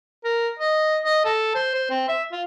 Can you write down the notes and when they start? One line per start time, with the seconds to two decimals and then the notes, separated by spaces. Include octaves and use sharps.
0.25 A#4
0.59 D#5
1.05 D#5
1.25 A4
1.55 C5
1.75 C5
1.90 C4
2.08 E5
2.32 F4